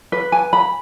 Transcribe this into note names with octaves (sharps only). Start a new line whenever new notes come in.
B4
G#5
B5